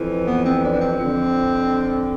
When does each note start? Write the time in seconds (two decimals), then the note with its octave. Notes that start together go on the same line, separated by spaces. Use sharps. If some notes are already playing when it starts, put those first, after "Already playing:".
Already playing: F2 E3
0.27 B3
0.45 C4
0.62 D4
0.72 D4
0.80 C4
0.97 F2
1.03 D3